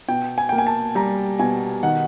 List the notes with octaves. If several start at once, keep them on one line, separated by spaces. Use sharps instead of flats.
B2 G5
G#5
A#3 G5
G#5
A5
G3 A#5
B2 G#5
D#3 F#5